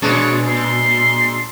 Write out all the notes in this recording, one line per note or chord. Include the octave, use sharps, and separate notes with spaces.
A#2 G#3 D4 C#5
C6